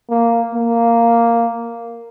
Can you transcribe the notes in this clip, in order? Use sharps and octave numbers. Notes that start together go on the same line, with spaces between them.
A#3
A#3